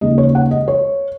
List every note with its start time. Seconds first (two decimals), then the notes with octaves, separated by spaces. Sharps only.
0.01 D#2 C#3 G#3 D#5
0.18 C#5
0.35 F#5
0.51 D#5
0.68 C#5